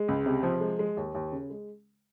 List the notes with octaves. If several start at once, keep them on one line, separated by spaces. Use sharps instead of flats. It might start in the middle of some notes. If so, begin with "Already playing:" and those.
Already playing: G#3
C#2
C3
F3
G#3
G#3
D#2
D#2
C#3
G#3